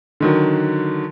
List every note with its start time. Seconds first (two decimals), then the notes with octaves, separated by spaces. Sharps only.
0.20 D3 D#3 F#3